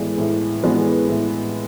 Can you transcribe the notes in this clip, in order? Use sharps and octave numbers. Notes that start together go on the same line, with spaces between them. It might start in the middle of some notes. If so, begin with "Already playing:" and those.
Already playing: A2 E3 G#3 B3 D4
A2
E3 G#3 B3 D4
A2